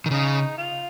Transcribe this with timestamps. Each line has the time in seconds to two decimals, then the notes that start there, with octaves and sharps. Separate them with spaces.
0.06 D#3
0.11 C#3 D#4
0.57 F4